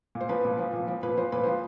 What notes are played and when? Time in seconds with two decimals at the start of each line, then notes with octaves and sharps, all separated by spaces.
0.15 A#2
0.21 C5
0.29 F3 B4
0.45 A#2
0.59 F3
0.73 A#2
0.88 F3
1.03 A#2 B4
1.17 F3 C5
1.32 A#2 B4
1.43 F3 C5